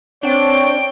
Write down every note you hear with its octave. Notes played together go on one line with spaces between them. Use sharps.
C4 D4 C#5 G5